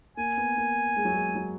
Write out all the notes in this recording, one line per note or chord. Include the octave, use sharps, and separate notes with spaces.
A#3 G#5
B3
A#3
G#3
F#3
G#3
F#3